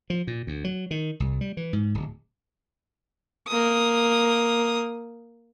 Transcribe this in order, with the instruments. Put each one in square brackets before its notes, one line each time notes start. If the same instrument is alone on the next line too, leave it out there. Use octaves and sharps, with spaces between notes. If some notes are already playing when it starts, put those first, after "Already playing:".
[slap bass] F3
A#2
D2
F#3
D#3
C2
G3
E3
G#2
D1
[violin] A#3 D#6